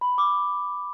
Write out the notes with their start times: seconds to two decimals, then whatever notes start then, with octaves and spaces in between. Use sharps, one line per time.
0.01 B5
0.18 D6